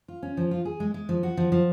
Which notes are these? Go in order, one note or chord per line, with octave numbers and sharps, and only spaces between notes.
F4
C#4
F3
F4
G#4
G#3
G#3
F3
F#4
F3
F3